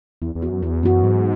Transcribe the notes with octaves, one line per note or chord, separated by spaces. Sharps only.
E2 E3
E2
B3 F#4
F#2
E2 E3
F#2 B3 F#4
G#2 F#3